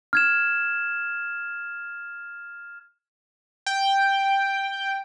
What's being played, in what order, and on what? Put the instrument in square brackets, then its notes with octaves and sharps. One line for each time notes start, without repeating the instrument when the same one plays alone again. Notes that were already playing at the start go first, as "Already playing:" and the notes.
[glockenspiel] F6 G#6 E7
[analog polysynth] G5